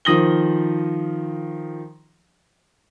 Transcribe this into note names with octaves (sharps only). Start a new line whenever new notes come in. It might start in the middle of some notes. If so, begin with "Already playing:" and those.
D#3 F3 D#6 A#6 F#7 G7